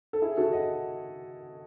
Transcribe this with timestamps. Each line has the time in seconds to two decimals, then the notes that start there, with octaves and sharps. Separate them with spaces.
0.13 A4
0.22 E4 G#4
0.37 F#4 A4
0.52 D#5 F#5